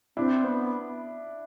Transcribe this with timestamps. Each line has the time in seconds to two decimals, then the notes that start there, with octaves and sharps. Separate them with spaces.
0.17 C4 D4 E4
0.44 B3